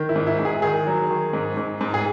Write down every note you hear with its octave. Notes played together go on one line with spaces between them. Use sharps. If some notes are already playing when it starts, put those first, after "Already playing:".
Already playing: D#3
E4
G#2
E4
G#2
G#4
D#3 G#4
F#3
D#3
G#2
G#2
G#2
G#4